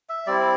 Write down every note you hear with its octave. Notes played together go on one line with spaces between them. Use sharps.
E5
G3 C4 E4 D5